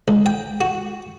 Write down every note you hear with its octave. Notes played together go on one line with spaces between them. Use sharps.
C#2
G5
F#4